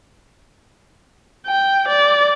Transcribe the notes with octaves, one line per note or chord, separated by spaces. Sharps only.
G5
D5